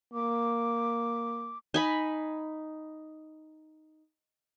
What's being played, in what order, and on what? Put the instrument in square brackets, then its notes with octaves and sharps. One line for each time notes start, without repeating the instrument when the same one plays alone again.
[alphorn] A#3 [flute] D6
[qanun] D#4 G#5 B5